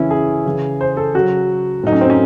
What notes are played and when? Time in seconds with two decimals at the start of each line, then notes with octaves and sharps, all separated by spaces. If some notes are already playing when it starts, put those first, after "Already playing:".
Already playing: C#3 E3 C#4 E4
0.11 G#4
0.46 C#3 E3
0.81 C5
0.97 A4
1.15 C#3 F#3 F#4
1.83 A2 F#3 D#4
1.92 C#4
2.01 C4
2.10 C#4